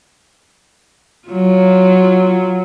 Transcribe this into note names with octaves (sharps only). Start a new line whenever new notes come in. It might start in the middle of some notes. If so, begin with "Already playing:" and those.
F#3 F4